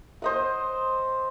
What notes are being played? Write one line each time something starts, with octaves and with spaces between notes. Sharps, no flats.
C5 D#5 F#5